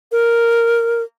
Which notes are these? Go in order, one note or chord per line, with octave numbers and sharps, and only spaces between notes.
A#4